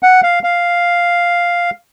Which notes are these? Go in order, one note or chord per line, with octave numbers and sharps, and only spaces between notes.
F#5
F5
F5